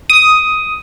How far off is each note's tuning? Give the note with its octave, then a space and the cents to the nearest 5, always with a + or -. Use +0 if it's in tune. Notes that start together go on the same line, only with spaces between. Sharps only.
D#6 +10